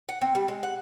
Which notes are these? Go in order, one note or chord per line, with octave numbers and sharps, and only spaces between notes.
F#5
C4
G3
G#3
F#5